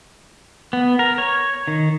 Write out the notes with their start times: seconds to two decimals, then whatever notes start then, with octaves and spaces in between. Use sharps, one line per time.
0.73 B3
0.99 A#4
1.18 C#5
1.68 D#3